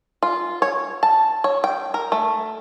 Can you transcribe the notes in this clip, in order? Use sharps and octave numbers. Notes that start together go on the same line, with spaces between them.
F4
C#5
A5
C#5
G5
A#4
A3